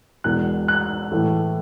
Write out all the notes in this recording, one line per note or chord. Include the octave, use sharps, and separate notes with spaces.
E1 E2 B2 F#6
F#6
A2 E3 A3